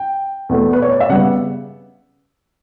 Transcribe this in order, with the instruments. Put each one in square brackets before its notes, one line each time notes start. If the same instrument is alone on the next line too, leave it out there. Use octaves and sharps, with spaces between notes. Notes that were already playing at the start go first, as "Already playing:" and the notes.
Already playing: [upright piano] G5
E2 B2 A3
B4
C#5
D5
E5
C#3 G3 B3 F#5